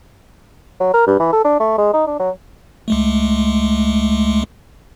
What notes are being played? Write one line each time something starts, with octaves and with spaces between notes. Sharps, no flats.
F#3
A#4
G2
E3
A4
D4
A3
G#3
D#4
D4
F#3
C#2 G#3 A3